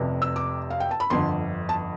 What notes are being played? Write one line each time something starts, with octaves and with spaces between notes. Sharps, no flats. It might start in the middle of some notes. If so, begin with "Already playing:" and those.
Already playing: F1 F2 C3
E6
D6
F5
G5
A5
B5
G1 F2 D3 C6
A5